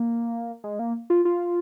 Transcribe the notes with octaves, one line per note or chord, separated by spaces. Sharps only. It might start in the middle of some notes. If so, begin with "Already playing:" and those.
Already playing: A#3
G#3
A#3
F4
F4